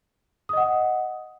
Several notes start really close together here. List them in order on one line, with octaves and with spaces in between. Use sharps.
D#6 D#5 F#5